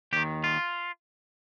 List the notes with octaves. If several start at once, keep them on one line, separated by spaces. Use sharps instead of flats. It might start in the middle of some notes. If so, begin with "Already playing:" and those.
D#2 D#3 G4
F4